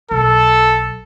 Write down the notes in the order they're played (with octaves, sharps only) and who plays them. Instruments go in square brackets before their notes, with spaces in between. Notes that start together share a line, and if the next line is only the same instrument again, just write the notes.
[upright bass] B1 [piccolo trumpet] A4